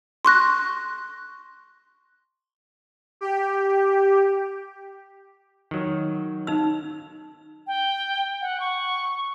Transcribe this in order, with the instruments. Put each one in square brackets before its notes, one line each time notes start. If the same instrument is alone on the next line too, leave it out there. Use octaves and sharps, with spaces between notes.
[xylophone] C6 C#6 F#6 A#6
[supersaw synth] G4
[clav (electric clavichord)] D#3 F#3
[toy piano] D#4 E6
[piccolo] G5
F#5
C#6